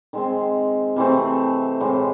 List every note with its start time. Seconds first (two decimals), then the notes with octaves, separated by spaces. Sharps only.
0.13 D#3 G#3 C4
0.96 C3 E3 A3 C4
1.80 A2 E3 G#3 C4